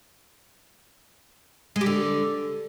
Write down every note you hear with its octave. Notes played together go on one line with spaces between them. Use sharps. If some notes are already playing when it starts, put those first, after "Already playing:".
G#3
G4
D3